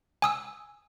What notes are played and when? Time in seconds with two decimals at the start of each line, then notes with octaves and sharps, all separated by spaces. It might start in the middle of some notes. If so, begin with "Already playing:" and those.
0.22 G#5 D#6 E6